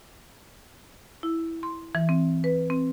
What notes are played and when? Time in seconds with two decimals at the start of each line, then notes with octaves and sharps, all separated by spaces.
1.23 E4
1.63 C6
1.95 E3
2.09 C4
2.44 B4
2.70 C4